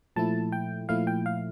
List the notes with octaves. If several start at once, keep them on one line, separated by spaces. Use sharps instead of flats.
A#2 F3 A3 E4 A5
G5
A#2 F3 A3 E4 F5
G5
F5